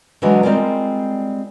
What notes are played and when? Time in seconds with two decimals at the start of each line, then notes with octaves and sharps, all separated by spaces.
0.22 D3 E3 F#3 G#3
0.43 G3 G#3 C4 F4 A#4 D5